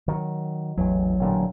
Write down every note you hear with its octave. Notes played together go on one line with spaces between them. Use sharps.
D#3 F#3
A1 E2 F#3
A1 A#2 D3